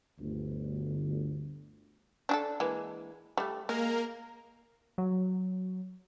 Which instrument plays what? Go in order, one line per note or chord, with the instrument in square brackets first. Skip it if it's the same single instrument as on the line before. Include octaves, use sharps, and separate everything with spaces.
[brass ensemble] G1 D2
[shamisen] D4 G#4 A4
E3 G#3 A#3
G3 A3
[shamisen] G#3 [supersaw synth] A#3 A#4 A#5
[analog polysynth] F#3